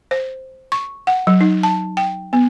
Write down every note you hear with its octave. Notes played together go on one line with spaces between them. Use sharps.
C5
C#6
F#5
F#3
D#4
A5
G5
B3